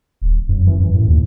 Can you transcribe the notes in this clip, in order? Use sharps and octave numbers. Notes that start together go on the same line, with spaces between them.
D#1
F#2
E3
F#2
A2
D#2